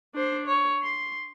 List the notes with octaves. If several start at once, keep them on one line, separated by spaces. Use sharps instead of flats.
D4 C5
C#5
C6